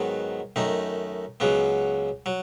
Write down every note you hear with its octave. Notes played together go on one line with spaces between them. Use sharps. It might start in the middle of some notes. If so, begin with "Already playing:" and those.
Already playing: G#2 D#3 F#3 B3
F#2 D#3 A3 D#4
C#2 C#3 F#3 B3
F#3